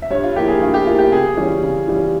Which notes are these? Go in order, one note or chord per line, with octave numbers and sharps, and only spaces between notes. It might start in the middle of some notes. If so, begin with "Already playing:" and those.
E5
G2 C#5
F4
F3 A#3 E4 G4
G#4
G2 F4
G4
F3 A#3 E4 F4
G4
C#3 G#4
E3 G3 C#4
C#3
E3 G3 C#4